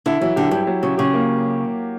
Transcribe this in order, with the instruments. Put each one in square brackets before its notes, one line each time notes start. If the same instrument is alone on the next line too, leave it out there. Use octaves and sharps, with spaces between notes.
[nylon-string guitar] D3 [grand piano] E4
[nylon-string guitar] E3 [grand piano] F#3
[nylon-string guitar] D3 [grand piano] G4
[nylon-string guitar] G2 [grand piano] G4
[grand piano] F#3
[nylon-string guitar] C#3 [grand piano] F#3
[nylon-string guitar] C#3 [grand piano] G4
[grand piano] A#3